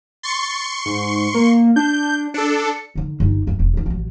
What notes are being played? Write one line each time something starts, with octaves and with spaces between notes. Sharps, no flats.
C6 C#6 A6 C#7
G#2
A#3
D4 G6
D4 A4 C#7
D3 D#3
G1 D#4
G1 G2
E1
A2 D#3
A1 F#3